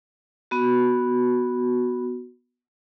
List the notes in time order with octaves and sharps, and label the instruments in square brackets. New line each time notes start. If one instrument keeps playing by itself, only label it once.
[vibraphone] B3 F#4